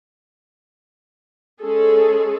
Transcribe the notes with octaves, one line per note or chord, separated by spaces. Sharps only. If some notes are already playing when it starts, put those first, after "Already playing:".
G#3 C#4 G#4 A4